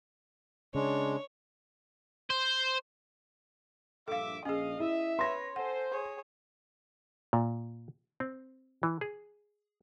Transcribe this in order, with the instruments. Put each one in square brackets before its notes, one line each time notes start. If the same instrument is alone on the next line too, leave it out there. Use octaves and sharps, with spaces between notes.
[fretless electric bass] C#3 [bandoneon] G#3 [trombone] D4 [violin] C#5
[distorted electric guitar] C5
[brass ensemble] A#1 G2 E5 [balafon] A4 F5 [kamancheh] D6
[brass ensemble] A#1 F5 [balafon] C#4 G#4 [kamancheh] D#5
[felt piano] E4 [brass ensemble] E5
[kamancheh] B4 C#5 [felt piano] C6 A#6
[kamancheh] A4 G#5 [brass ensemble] C5 [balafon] F#5
[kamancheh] G#4 C#5
[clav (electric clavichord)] A#2
C4
E3
G#4